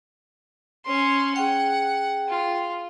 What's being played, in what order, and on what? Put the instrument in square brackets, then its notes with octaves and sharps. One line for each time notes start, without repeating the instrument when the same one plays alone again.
[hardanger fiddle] C#4 C6
[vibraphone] G#4 G5 [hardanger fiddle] F#5
[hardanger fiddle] F4